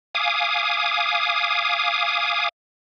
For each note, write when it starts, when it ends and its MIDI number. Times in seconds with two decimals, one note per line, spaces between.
0.15 2.49 77
0.15 2.49 80
0.15 2.49 86
0.15 2.49 87